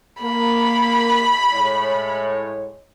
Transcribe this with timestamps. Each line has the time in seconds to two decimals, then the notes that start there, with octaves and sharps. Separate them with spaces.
0.22 A#3 B5
1.53 A2 G#3 C#5